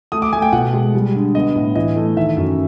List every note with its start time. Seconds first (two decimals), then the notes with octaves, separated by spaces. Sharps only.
0.12 A3 D#6
0.22 D6
0.33 A3 G#5
0.42 G5
0.53 B2 F#5
0.74 G#3
0.94 G3
1.15 D3
1.35 B3 D#5
1.55 A2
1.76 E3 D#5
1.96 A3
2.17 D#3 E5
2.37 F#2